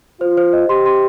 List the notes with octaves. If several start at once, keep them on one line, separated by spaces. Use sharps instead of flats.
F4 C5
C5
D#5
G4 C6
C6